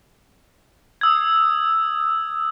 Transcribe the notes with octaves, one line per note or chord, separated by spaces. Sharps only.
D#6 E6 G#6